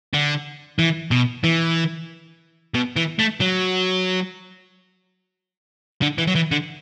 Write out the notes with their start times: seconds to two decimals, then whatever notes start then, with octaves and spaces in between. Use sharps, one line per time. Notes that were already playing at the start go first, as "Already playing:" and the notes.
0.14 D3
0.79 E3
1.11 B2
1.44 E3
2.75 B2
2.96 E3
3.19 A3
3.40 F#3
6.02 D3
6.18 E3
6.28 F#3
6.35 E3
6.52 D3